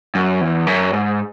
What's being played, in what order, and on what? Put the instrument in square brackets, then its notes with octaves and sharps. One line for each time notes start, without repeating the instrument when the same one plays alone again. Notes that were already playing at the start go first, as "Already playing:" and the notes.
[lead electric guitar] F#2
E2
F#2
G#2